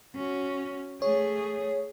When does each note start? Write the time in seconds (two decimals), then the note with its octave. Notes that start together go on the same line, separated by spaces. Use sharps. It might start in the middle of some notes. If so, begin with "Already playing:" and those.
0.15 C#4 F#4
1.02 A3 G#4 C#5